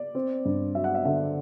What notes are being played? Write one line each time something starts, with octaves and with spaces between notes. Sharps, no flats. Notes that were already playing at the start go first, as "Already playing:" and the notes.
Already playing: D5
C4
G2
F#3 E5
F#5
E5
D3 E5